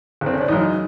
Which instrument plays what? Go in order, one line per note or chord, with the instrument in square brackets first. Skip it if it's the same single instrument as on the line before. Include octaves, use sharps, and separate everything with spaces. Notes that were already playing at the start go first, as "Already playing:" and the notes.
[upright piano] F#1
C4
C#4
D4
F#2 C#3 E3 D#4